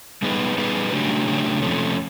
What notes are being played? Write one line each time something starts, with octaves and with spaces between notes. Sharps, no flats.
G3 B3 D#4 G#4 B4
G3 B3 D#4 G#4 B4
C#3 F#3 A3 D4 G4
C#3 F#3 A3 D4 G4
F2 C3 F3 A3 C#4